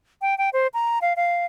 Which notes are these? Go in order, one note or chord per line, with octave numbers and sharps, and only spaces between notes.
G5
G5
C5
A#5
F5
F5